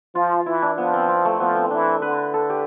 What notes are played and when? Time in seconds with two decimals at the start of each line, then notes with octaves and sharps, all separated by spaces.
0.15 F3 F4
0.46 E3 E4
0.62 D4
0.77 F3 B3
0.94 C4
1.08 C4
1.25 A3
1.40 F3 B3
1.55 C4
1.71 E3 D4
2.02 D3 B4
2.34 A4
2.50 G4